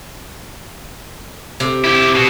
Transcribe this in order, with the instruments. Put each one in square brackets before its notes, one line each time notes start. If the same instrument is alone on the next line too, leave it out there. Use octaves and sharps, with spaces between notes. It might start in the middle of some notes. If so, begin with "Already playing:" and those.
[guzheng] C3
[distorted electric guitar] E4 G4
B2